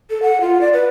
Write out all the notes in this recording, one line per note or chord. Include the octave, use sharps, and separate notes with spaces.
A4
F#5
F4
D5
B4